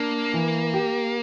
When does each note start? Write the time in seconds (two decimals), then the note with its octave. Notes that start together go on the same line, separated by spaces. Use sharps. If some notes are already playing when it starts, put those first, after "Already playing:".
Already playing: A#3 D4
0.34 E3
0.74 G4